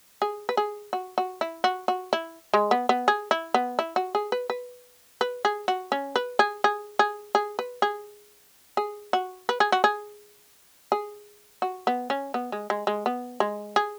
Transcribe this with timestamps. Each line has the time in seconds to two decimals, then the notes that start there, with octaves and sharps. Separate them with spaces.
0.22 G#4
0.49 B4
0.57 G#4
0.93 F#4
1.18 F#4
1.41 E4
1.64 F#4
1.88 F#4
2.13 E4
2.54 G#3
2.71 B3
2.89 B3
3.08 G#4
3.31 E4
3.54 B3
3.79 E4
3.96 F#4
4.15 G#4
4.32 B4
4.50 B4
5.21 B4
5.45 G#4
5.68 F#4
5.92 C#4
6.16 B4
6.39 G#4
6.64 G#4
6.99 G#4
7.35 G#4
7.59 B4
7.82 G#4
8.77 G#4
9.13 F#4
9.49 B4
9.60 G#4
9.72 F#4
9.84 G#4
10.92 G#4
11.62 F#4
11.87 B3
12.10 C#4
12.34 B3
12.52 G#3
12.70 G#3
12.87 G#3
13.06 B3
13.40 G#3
13.76 G#4